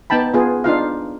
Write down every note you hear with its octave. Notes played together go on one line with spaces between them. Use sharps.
B3 D#4 G5 A5 B5
B3 F4 G#4
D4 D#4 F4 F5